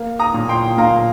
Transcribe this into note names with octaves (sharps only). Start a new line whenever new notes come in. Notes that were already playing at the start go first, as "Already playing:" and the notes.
Already playing: A#3
A#5 D#6
A#2
G5 C6
A#2 F5 A#5